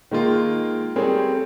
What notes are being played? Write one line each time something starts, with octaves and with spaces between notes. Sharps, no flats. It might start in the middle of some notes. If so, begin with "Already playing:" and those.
D#3 G#3 A#3 F4
G3 A3 C4 G#4 A#4 C#5